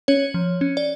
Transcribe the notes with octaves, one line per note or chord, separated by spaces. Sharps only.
C#4 C#5
F3
C#4
D5